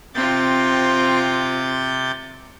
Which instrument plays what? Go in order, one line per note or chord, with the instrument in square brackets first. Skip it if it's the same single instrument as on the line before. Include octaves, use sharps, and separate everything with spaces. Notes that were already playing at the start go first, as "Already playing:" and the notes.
[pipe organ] C3 G6 A6 [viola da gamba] C4 F4